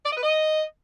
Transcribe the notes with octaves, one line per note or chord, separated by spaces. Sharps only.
D5
D#5
B4
D#5